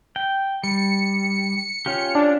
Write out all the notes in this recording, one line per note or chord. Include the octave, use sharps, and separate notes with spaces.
G5
G3 C#7
C#4 F4 G4
D4